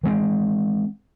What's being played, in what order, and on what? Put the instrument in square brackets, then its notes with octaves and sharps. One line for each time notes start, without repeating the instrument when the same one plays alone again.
[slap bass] E3 G#3 C4